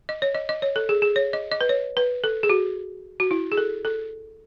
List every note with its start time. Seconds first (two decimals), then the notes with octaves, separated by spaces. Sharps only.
0.09 D#5
0.22 C#5
0.35 D#5
0.49 D#5
0.62 C#5
0.76 A4
0.89 G#4
1.02 G#4
1.16 C#5
1.33 D#5
1.52 D#5
1.61 B4
1.69 C#5
1.97 B4
2.24 A4
2.43 G#4
2.50 F#4
3.20 F#4
3.31 E4
3.52 G#4
3.57 A4
3.85 A4